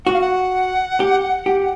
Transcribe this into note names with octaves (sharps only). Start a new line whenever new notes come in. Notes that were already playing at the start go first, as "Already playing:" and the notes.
F#4 F#5
F5
F#5
G4
G4